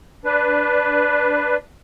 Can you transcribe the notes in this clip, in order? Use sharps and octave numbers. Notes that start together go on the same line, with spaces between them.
D4 B4